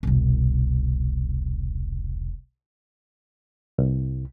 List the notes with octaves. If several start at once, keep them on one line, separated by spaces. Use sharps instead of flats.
E1 C2
C2